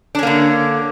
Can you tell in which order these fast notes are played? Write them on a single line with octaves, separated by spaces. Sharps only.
D4 C#4 A#3 D3